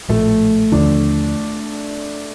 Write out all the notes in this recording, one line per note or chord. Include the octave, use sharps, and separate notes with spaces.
A#1 A2 F3 A3
D#2 D3 F3 D4